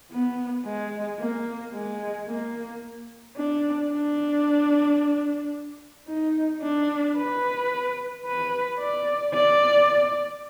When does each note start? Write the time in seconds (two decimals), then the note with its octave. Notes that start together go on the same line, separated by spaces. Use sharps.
0.12 B3
0.66 G#3
1.20 A#3
1.74 G#3
2.28 A#3
3.37 D4
3.92 D4
6.08 D#4
6.63 D4
7.17 B4
8.26 B4
8.80 D5
9.34 D5